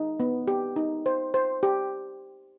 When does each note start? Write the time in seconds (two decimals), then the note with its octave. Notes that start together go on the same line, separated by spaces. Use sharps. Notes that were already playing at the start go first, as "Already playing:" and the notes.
Already playing: D#4
0.20 B3
0.48 G4
0.76 D#4
1.06 C5
1.34 C5
1.63 G4